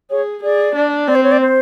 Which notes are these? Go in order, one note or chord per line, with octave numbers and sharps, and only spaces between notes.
G#4 C#5
G#4 D5
D4
C4 D5
C5
C#5
D5
C5